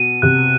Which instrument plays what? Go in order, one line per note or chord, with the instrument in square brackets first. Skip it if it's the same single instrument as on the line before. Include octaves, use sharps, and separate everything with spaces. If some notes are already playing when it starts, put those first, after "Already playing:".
Already playing: [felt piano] B2 [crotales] D#7
[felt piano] C3 [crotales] F#6